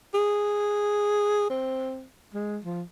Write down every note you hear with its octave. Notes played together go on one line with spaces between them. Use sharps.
G#4
C4
G#3
F3